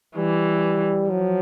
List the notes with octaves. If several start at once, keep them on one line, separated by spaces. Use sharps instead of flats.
E3 G3
F3 F#3